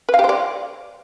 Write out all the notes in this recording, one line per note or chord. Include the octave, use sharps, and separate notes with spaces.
B4
F5
G4
C5
D5